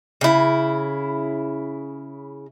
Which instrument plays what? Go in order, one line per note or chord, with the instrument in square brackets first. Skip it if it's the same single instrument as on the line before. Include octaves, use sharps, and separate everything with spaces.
[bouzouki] C#3 E4